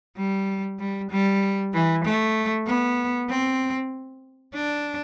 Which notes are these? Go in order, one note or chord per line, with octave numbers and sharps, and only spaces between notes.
G3
G3
G3
E3
A3
B3
C4
D4